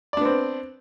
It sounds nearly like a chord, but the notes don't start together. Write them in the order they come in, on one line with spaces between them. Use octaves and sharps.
D5 D4 B3 C4